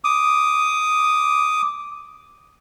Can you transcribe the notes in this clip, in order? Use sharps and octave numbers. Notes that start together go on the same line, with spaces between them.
D6 D#6